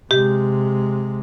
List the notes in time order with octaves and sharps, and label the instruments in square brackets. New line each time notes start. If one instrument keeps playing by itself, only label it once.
[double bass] C3 G#3 [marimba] G4